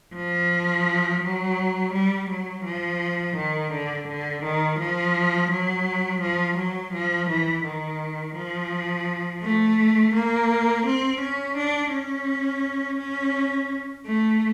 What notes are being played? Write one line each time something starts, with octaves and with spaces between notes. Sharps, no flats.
F3
F#3
G3
F#3
F3
D#3
D3
D3
D#3
F3
F#3
F3
F#3
F3
E3
D#3
F3
A3
A#3
C4
C#4
D4
C#4
C#4
A3